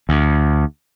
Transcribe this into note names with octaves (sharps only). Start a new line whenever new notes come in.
D2